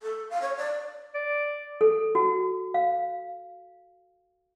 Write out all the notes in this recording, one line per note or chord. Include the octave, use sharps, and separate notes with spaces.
A4
F5
C#5
D5
D5
A4
F#4
F5